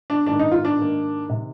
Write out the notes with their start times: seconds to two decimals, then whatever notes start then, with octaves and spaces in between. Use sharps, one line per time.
0.10 D4
0.26 G#2 D#3 A#3 D4
0.39 D#4
0.52 F4
0.65 D4
0.77 G#2 D#3 A#3
1.28 C3 D#3